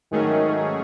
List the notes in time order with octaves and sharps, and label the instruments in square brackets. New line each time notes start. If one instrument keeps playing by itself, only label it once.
[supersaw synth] G#2 F#3 A3 C#4 G#4 [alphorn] D#3